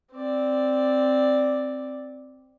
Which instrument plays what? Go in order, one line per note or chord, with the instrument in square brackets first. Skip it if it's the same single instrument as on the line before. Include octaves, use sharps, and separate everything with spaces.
[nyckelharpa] C4 D5